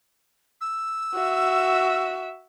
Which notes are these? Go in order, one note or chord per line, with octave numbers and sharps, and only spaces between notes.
E6
F#4 E5